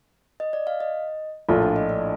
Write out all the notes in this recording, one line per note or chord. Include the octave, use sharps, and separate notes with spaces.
D#5
D5
F5
D#5
A#1 A2 A3 D4 F4 D5
F5
D#5
D5